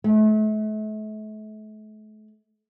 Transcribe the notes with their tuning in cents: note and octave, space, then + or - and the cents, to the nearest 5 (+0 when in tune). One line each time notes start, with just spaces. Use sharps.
A3 -40